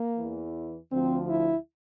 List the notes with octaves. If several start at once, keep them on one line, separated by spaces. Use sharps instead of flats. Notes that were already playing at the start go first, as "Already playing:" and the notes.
Already playing: A#3
E2 E3
D2 D3 F3 C4
E4